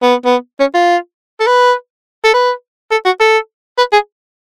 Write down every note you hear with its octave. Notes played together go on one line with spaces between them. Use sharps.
B3
B3
C#4
F4
A4
B4
A4
B4
A4
F#4
A4
B4
G#4